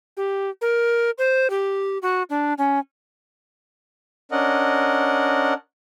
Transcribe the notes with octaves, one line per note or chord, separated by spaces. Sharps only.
G4
A#4
C5
G4
F#4
D4
C#4
C#4 D4 A#4 D#5 F#5